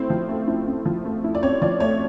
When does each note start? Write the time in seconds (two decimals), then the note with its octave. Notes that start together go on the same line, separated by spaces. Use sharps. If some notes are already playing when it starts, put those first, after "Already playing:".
Already playing: A3 C4 E4 C5
0.10 F3
0.29 A3
0.47 E4
0.67 C4
0.85 F3
1.05 A3
1.24 E4
1.35 D5
1.42 C4 C#5
1.62 F3 D5
1.80 A3 C#5